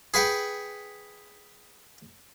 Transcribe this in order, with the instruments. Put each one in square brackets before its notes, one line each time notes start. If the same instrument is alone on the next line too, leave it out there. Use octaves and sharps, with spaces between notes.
[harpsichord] G#4 B4 F#5 G5